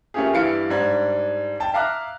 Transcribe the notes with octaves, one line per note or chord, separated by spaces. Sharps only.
A3 A#3 C#4 F4 G4 G#4
G2 E3 E4 F5 C#7 D7
G#2 G3 D4 G#6
G5 A5
E5 F5 A#5 D6 F6 F#6